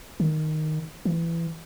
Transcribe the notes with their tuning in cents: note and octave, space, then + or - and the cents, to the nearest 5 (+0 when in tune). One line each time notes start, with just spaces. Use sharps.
D#3 -5
E3 +20